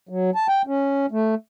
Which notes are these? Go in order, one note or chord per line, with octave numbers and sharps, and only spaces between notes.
F#3
A5
G5
C#4
A3